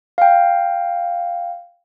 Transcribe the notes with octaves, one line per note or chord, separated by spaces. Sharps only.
F5 G5